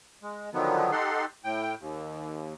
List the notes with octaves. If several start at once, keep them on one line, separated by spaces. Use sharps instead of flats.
G#3
D3 D#3 F3 F#3 B3
D#4 G4 A4 F#5 C6
A2 G5
D#2